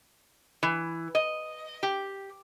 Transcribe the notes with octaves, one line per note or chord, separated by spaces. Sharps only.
E3
D#5
G4